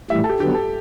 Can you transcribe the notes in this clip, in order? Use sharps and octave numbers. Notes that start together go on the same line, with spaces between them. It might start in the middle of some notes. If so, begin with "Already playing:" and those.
A2 E3 G3 E5
A4
G4
D3 F#3 B3 G4
A4